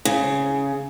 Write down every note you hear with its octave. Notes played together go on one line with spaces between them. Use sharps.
C#3